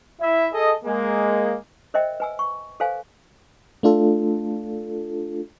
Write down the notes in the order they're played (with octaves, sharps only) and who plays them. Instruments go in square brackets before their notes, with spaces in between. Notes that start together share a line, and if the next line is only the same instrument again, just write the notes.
[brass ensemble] E4 E5
G#4 A4 D#5
G#3 A#3
[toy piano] A#4 C5 D#5 E5 G5
B4 G#5 E6
C#6
A4 B4 C5 F5 G#5
[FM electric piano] A3 D4 F4 A4